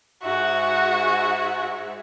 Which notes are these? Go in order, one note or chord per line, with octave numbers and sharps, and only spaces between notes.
G#2 F#4 E5